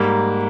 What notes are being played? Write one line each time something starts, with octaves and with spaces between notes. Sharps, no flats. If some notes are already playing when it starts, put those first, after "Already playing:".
Already playing: G#2 G3 A#3